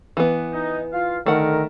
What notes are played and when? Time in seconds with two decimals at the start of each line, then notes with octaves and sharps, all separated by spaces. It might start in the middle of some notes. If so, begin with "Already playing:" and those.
0.17 E3 B3
0.53 D#4
0.92 F4 F5
1.26 D3 D#3 A3 A#4 F#5